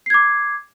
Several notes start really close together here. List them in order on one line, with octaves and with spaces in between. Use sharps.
C7 G#6 D6